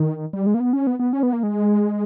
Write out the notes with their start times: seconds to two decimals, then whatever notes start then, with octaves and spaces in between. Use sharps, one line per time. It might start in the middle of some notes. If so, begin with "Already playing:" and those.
Already playing: D#3
0.33 G3
0.46 G#3
0.54 A#3
0.60 B3
0.73 C#4
0.87 B3
0.99 B3
1.13 C#4
1.23 B3
1.33 A#3
1.43 G#3